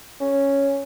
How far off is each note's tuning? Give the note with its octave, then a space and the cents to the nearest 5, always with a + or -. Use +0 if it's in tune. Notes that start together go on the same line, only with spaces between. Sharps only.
C#4 +0